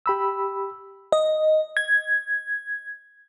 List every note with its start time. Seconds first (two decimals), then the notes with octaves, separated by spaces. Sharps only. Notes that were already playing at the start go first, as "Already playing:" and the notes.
0.06 G4 B5 E6
1.12 D#5
1.77 G#6